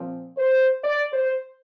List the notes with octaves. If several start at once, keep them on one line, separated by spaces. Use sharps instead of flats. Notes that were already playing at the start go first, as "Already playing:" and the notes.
Already playing: A#2 F3 C4
C5
D5
C5